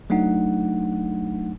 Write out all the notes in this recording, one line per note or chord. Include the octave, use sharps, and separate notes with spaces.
F#3 A3 D4 D#4 F#5